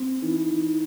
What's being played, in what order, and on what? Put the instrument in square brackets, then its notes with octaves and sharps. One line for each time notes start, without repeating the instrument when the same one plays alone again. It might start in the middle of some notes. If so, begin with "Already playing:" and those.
Already playing: [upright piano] C4
[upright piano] E3 [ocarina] D#4
[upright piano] E3